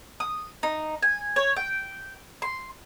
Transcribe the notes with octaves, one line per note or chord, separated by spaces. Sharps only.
D#6
D#4
G#5
C#5
G5
C6